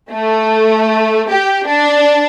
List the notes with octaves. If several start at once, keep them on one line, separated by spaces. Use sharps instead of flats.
A3
G4
D4